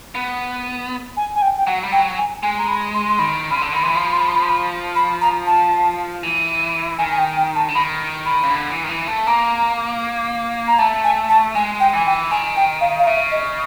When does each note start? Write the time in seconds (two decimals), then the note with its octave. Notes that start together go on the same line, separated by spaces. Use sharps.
0.15 B3
1.17 G#5
1.35 G#5
1.42 G5
1.58 G5
1.67 F#3 F#5
1.83 G3
1.92 F#3 G5
2.18 G#5
2.43 G#3 G#5
2.58 A#5
2.68 B5
2.94 C6
3.09 C6
3.19 D#3 B5
3.51 C#3 B5
3.57 C6
3.62 D3
3.73 D#3 B5
3.83 E3 C6
3.91 B5
3.95 F3 C6
4.05 B5
4.13 C6
4.21 B5
4.28 C6
4.36 B5
4.42 C6
4.49 B5
4.96 B5
5.21 A#5
5.47 A5
6.23 E3
6.98 D#3 G#5
7.11 G#5
7.18 G5
7.37 G5
7.55 A5
7.68 D3
7.75 D#3 B5
8.26 B5
8.43 C#3
8.51 D3
8.70 E3
8.83 D#3
8.89 E3
9.08 A3
9.27 A#3 A#5
10.68 A#5
10.79 A3 A5
11.04 G#5
11.29 A5
11.55 G#3 G#5
11.80 G5
11.93 E3 G#5
12.06 G5
12.31 D#3 G#5
12.56 G5
12.81 F5
12.99 F5
13.07 C#3 E5
13.32 D#5